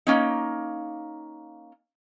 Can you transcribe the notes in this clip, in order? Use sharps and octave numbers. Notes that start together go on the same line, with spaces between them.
A#3 C#4 D#4